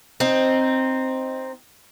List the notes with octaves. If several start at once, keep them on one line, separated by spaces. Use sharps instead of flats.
C4 D#4